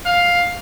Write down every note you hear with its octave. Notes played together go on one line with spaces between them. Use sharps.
F5